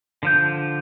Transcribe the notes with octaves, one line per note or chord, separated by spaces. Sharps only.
D3 F3 G6